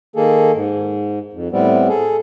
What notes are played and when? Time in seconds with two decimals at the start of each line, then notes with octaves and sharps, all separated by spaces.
0.16 D#3 A#3 G#4 A4
0.54 G#2
1.33 F2
1.52 A2 G3 B3 C4
1.88 G#4 A4